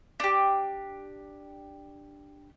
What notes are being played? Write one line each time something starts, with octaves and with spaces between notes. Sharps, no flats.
D4 G4